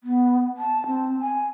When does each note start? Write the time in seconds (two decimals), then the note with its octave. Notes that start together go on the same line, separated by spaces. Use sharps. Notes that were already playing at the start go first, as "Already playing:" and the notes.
0.03 B3
0.57 A5
0.86 C4
1.20 G#5